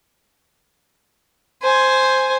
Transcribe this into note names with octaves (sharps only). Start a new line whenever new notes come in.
C5 G#5